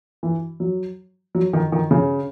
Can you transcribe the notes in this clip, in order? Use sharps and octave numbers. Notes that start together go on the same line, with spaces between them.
E3
F#3
F#3
D#3
D#3
C#3